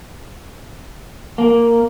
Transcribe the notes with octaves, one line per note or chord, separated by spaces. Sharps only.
A#3